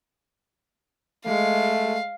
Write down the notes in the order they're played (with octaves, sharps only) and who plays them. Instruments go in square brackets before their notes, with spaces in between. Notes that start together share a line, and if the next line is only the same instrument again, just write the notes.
[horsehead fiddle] G#3 [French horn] A3 [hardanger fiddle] F5